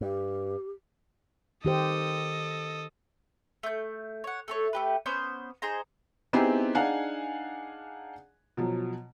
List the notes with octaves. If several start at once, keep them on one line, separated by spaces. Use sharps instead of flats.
G2 G4
D#3 G4 A4 C5 D#5
A3 G6
C#5 F#5
A3 A4 C#5
A3 G4 B4
B3 C#4 C5 G6
D#4 G#4 C5 A#5
B3 C4 D#4 E4 G4 G#4
D4 D#4 G#4 F5 F#5 G#5
B2 F3 F#3